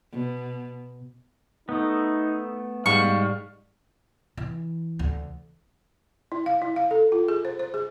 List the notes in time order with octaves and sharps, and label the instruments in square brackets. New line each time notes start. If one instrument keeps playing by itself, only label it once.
[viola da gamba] B2
[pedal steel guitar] A3 B3 [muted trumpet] D#4
[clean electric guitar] G#2 G3 G#3 [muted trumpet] F5 [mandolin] C#6
[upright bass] E3
D2
[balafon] E4
F5
E4
F5
A4
F4
G#4
C5
C5
G#4